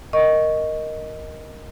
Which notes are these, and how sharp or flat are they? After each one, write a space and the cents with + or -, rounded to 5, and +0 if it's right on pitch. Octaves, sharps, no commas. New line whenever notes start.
A#4 +0 D#5 +0 C#6 +0